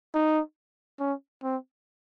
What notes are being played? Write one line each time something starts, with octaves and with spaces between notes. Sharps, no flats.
D#4
C#4
C4